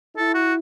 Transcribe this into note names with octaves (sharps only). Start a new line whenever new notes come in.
E4 A4
F#4